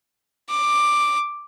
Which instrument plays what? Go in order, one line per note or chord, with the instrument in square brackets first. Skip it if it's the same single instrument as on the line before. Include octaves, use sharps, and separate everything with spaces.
[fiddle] D6